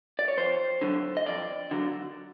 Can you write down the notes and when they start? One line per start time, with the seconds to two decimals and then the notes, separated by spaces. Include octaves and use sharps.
0.19 D5
0.28 C#5
0.37 F2 C5
0.81 D3 F#3
1.17 D#5
1.26 F2 D5
1.71 D3 F#3